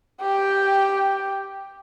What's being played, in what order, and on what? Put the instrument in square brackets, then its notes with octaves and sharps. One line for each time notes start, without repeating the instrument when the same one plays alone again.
[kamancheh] G4 G5